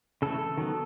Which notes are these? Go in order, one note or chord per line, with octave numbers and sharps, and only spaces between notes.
C#3 E3 A3 A4
D#3 F#3 B3